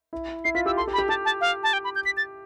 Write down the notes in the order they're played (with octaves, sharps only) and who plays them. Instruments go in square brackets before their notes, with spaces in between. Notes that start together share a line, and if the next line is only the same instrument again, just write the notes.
[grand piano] E4
[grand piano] E4 [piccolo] C7
[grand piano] F4 [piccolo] B6
[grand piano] G4 [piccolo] E6
[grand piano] A4 [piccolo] C6
[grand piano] G4
[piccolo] B5
[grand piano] G4
[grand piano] G4 [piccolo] A5
[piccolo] A5
F5
A5
G5
B5
G6
B6
A6